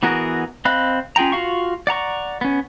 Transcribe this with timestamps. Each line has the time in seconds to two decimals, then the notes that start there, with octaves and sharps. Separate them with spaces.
0.03 E3 B3 F#4 G#4 A#4
0.65 C4 D#5 F5 B5 F#6
1.16 C#4 F4 G#4 G5 A#5
1.32 F4 F#4 F5 C#6
1.87 D5 F#5 A#5 C#6
2.41 B3 C#4